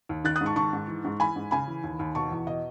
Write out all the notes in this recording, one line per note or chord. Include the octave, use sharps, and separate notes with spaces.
D#2
D#3 F#6 A6
D#6 F#6
G#2
A5 C#6
D#3 A5 C#6
G#2
E3
G#2
E3 G#5 B5
G#2
C#3 G#5 B5
E3
D#2
D#2
B2 A5 C#6
E2
B2 D#5